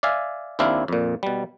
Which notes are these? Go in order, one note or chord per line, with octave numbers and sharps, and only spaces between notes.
D5 E5 F5 G#5
D#2 C4 D4 E4 F5
F2 A#2
B2 G3